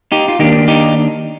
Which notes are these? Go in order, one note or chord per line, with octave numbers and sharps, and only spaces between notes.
D#4 G4
F4
D#3 A#3 D4 D#4 G4
D#4 G4